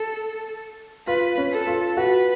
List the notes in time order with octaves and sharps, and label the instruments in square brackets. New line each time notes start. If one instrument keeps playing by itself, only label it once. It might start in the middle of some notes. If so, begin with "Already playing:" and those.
Already playing: [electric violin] A4
[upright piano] F4 [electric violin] B4
[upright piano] C#4
[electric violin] A4
[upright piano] F4
[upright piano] F#4 [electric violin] B4